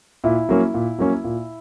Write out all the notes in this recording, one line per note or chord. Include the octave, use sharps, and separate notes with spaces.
A#2 E4
F#3 A#3 C#4
A#2
F#3 A#3 C#4
A#2